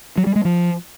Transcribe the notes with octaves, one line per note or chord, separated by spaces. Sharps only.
F#3
G3
G#3
F3